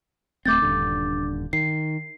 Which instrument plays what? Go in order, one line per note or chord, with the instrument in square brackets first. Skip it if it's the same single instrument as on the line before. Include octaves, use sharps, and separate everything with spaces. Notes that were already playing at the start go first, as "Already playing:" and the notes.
[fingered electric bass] D1 A3 C4 [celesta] D6 G6 A6
[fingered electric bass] D#1 G2 D3
[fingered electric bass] D#3 [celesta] C7